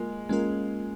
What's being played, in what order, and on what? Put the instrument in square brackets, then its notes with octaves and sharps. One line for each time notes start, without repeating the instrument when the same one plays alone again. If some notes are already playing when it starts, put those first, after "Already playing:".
Already playing: [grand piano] G#3 [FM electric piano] A#3 F4 A#4
[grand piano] G#3 [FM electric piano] A#3 C#4 F4 A#4